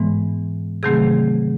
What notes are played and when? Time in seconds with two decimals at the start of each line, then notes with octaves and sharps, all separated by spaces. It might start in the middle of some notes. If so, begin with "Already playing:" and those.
Already playing: G#2 E3 G#3 B3
0.83 C3 D#3 F#3 A3 C4 G#4